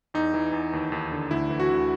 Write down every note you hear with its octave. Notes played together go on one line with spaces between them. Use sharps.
E2 D#4
E3
E2
D#2
D#2
D3
D2 E4
E3
F#4
D2